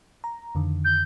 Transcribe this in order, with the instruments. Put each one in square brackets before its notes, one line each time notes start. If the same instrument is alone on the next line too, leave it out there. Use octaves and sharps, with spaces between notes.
[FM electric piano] A#5
F2 D3 D#3
[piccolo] G6